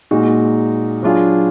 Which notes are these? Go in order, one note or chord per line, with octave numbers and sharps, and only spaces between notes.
A#2 G#3 D#4 F#4
F#3 D4 F4 G#4